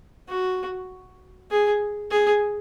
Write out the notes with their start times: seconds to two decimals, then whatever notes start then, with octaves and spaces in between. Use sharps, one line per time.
0.29 F#4
1.51 G#4
2.11 G#4